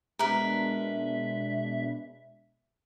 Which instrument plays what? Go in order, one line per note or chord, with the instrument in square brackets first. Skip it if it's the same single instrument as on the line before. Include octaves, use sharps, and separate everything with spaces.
[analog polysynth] B2 G#3 D4 [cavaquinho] A#4 B4 [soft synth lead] E5